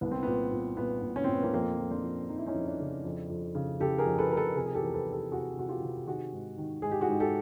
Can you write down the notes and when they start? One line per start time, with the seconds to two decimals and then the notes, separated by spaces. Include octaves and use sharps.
0.01 C2 B3
0.11 C4
0.23 A#2 B3
0.52 A#2
0.77 A#2 B3
1.02 A#2
1.16 C#4
1.24 A#2 C4
1.33 B3
1.43 A#3 C4
1.53 F2 A#3 C4
1.78 F2
1.91 C4 D4
2.03 F3
2.29 F2 D#4
2.38 E4
2.46 C#4 D#4
2.54 F2
2.66 D4 E4
2.80 C#3
3.05 F2
3.30 F2
3.55 C#3
3.80 C#3 G4 A4
3.98 G#4 A#4
4.05 F2
4.19 A4 B4
4.31 F2 A#4
4.37 A4 B4
4.55 C3 G#4 A#4
4.66 G#4
4.75 G4 A4
4.81 E2 A#4
4.94 A4 B4
5.06 C3
5.12 G4 A4
5.31 C3 F#4 G#4
5.57 C3 F#4
5.69 F4 G4
5.82 C3
6.07 D#3 F#4 G#4
6.33 G#2
6.58 D#3
6.82 G#2 G#4
6.92 G4
7.01 F#4 G#4
7.08 G#2
7.20 G4 A4